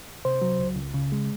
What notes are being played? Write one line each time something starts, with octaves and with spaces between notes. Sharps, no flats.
C3 C5
F#3
C#2
C#2
C#3
G#3